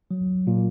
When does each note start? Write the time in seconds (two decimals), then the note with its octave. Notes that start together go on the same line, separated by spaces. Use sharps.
0.11 F#3
0.47 A#2